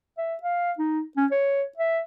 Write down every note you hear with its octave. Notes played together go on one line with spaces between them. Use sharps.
E5
F5
D#4
C#4
C#5
E5